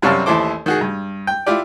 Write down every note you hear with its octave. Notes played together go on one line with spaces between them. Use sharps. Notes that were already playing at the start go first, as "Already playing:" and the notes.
F#2 C3 G3 C#5 F5 A5
A1 D#2 E4 A4 C5 D6
D#3 F#4 G#4
G2
G5
E4 F4 G4 D5